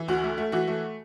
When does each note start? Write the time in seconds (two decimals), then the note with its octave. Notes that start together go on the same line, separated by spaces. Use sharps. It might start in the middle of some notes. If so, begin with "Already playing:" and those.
Already playing: E3
0.08 D2 F#4
0.24 A3
0.38 A3
0.52 E3 F#4
0.68 A3